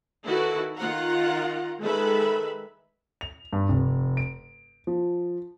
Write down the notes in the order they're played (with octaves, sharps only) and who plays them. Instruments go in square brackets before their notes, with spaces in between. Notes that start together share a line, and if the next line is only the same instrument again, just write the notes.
[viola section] D#3 E4 F#4 A4 B4
D#3 F4 F#5 A#5
D#3 G#3 A4 B4 E5 B5
[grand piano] F7
G2
F1
D7
F3